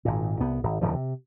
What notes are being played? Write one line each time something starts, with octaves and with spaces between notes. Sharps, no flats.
G#1 A#2
C2 B3
G#1
D1 E2 G#2 F3
C3